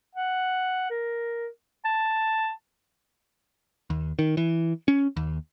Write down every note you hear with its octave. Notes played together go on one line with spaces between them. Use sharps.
F#5
A#4
A5
D#2
D#3
E3
C#4
D#2